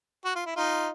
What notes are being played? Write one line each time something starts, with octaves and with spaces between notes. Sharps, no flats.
F#4
F4
E4
D#4 F4